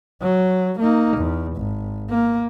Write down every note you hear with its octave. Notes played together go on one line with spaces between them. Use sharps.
F#3
A#3 D#4
E2
G#1
A#3